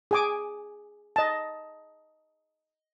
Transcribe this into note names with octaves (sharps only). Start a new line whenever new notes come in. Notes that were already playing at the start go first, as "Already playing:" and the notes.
G#4 G#5 D6
D#5 A5